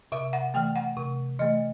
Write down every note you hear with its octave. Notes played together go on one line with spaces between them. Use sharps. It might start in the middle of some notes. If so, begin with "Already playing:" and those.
C3 E5
F#5
E3 A3 G5
F#5
C3
E3 A3 D#5